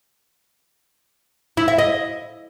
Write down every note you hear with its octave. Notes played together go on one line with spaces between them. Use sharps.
E4
E5
D#5